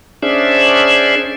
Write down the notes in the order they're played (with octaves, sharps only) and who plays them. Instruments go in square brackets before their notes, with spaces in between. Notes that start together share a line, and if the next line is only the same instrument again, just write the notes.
[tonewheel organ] C#4 D4 G#4 C5 D5 E5